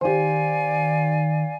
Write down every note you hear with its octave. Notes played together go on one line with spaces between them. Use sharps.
D#3 G4 C5 D5 F5 G#5